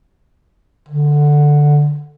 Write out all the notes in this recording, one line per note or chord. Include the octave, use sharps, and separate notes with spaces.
D3